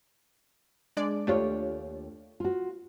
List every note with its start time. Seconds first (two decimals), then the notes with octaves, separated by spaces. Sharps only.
0.97 G#3 D4 D5
1.27 D#2 A3 D4 F4 G4 C#5
2.40 F4 F#4